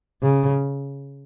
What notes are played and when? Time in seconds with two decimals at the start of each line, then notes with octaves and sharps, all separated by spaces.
0.23 C#3